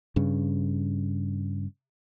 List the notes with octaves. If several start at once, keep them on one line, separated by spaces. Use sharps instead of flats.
G2 C#3